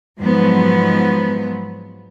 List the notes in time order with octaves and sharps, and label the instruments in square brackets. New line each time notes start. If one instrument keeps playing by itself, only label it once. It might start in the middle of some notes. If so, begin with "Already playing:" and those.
[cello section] G#2 F3 F#3 B3